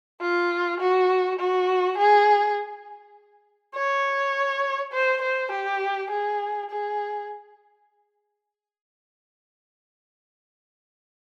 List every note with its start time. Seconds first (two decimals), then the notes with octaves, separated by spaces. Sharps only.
0.20 F4
0.80 F#4
1.39 F#4
1.98 G#4
3.74 C#5
4.92 C5
5.22 C5
5.52 G4
6.10 G#4
6.70 G#4